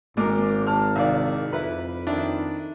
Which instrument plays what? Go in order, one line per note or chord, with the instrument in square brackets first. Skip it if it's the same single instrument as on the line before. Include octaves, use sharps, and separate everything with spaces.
[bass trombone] G#1 [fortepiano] G#2 A#4 [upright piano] G#3 D6
[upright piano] A5 F6
[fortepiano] C2 D#3 D5 [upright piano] F5
[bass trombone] F2 [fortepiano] E4 B4 B5
[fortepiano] D#3 D4 E4